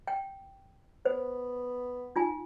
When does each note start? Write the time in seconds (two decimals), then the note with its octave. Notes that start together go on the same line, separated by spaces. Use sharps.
0.07 G5
1.05 B3 C5
2.16 D#4 F4 G#5